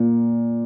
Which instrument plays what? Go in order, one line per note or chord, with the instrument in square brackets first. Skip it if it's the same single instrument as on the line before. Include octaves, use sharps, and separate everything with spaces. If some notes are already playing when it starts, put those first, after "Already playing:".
Already playing: [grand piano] A#2